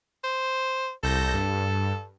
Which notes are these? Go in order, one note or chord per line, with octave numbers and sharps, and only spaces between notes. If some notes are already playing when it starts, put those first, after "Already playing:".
C5
C2 A4 G6 A#6
G2